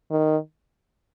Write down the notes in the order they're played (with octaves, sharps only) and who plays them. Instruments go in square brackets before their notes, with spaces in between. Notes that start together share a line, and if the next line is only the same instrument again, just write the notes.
[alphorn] D#3